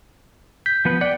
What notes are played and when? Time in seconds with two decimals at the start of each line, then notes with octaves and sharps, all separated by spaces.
0.66 G6 B6
0.85 F3 B3 B4
1.01 D5 F#5 G5